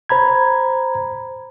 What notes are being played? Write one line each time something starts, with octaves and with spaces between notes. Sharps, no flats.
C5 A#5 B5 G#6